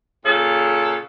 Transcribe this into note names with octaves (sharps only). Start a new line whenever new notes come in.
A#2 C#3 A4